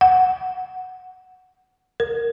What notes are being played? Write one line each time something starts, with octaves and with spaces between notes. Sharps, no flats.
F#5
A#4